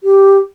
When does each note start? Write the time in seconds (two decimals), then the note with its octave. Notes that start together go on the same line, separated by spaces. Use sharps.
0.04 G4